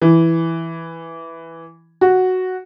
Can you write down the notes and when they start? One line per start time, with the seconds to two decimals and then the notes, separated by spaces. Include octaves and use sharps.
0.02 E3
2.01 F#4